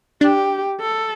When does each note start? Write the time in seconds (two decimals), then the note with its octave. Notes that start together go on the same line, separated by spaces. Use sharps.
0.21 D4 G4
0.80 A4